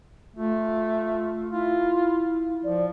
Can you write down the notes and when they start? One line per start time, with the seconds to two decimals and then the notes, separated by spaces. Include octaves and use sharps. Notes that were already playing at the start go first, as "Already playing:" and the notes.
0.36 A3 F4
1.51 E4 F4
2.63 F3 D5